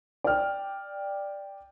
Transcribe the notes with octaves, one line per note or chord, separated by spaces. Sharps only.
D5 G5 F6